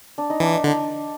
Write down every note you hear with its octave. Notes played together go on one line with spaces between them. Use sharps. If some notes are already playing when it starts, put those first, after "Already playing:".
D4
D#4
E3 D4
D#4
D3 D4